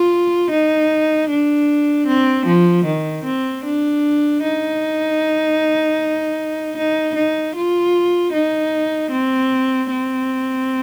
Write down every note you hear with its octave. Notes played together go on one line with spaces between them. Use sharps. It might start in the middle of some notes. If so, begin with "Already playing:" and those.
Already playing: F4
D#4
D4
C4
F3
D#3
C4
D4
D#4
D#4
D#4
F4
D#4
C4
C4